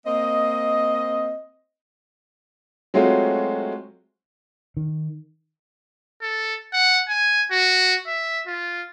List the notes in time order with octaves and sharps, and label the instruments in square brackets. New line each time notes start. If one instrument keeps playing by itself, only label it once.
[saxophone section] A#3 C4 D#5
[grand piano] F#3 G#3 A3 C4 F4 F#4
[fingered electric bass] D#3
[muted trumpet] A4
F#5
G#5
F#4
E5
F4